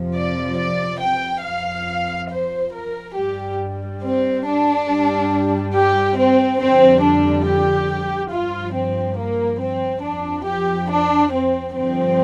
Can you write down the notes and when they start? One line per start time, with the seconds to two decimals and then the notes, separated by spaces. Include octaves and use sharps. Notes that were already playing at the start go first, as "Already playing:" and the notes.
Already playing: F2 C3 F3
0.15 D5
0.58 D5
1.01 G5
1.44 F2 F3 F5
2.30 C5
2.73 A#4
3.15 G2 G3 G4
4.02 C4
4.45 D4
4.88 G2 G3
5.73 G4
6.17 C4
6.60 F2 D3 G3 C4
7.02 D4
7.46 G4
8.31 G2 F3 F4
8.74 C4
9.17 A#3
9.60 C4
10.03 F2 F3 D4
10.46 G4
10.89 D4
11.33 C4
11.74 G2 D3 F3 C4